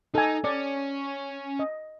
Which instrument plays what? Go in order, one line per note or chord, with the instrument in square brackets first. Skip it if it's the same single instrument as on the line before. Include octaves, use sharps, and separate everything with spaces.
[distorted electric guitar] D#4 [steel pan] A4 G#5
[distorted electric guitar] C#4 [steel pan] D5
[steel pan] D#5